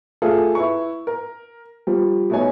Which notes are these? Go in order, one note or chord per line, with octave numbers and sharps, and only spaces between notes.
A3 F4 G#4 A4
E4 B4 C#6
A#4
F3 G3
B2 A3 B3 D#4 C#5 G#5